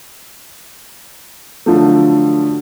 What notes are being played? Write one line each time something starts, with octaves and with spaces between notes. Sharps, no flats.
D3 F3 F#3 A3